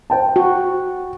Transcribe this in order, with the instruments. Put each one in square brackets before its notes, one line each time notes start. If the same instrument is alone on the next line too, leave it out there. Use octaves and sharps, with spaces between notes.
[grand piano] C5 G5 A5
[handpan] F#4